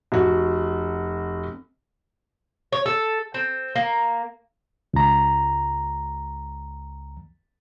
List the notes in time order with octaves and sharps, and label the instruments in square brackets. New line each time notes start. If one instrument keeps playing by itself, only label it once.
[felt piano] F1 F#4
[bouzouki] C#5
A4
C4
A#3
[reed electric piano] C#2 A#5